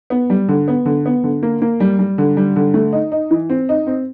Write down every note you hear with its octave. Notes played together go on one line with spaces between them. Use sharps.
B3
G3
D3
B3
D3
B3
D3
A#3
A#3
G3
G3
D3
G3
D3
A3
D#4
D#4
E3
C4
D#4
C4